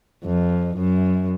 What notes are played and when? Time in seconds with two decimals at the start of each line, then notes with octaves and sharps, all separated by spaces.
0.24 F2
0.77 F#2